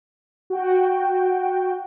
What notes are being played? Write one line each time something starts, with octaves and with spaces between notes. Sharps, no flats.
F#4 G5